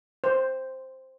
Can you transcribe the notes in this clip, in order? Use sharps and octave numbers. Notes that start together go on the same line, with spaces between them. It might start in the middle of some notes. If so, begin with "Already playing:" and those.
C5